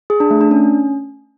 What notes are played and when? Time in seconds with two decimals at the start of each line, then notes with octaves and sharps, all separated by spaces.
0.10 G#4
0.20 D4
0.30 A3
0.41 D4
0.51 C#4